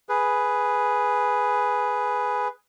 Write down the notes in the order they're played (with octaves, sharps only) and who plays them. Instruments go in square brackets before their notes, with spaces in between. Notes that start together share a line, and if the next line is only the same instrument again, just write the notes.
[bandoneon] G#4 B4